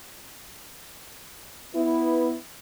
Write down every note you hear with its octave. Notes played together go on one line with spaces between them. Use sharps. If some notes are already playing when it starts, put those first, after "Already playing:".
B3 E4